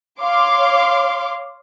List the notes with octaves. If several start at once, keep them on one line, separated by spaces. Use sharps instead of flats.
C#5 F5 C6 D6